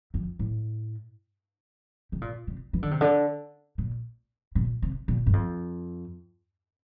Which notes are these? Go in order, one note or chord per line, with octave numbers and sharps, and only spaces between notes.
F2
A2
C3
A#2
C3
E3
D3
C3
D3
A#2
A#2
C3
A#2
G2
F2